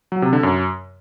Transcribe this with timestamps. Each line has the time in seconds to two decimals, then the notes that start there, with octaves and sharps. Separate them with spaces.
0.12 F#3
0.22 C3
0.33 D3
0.43 F#2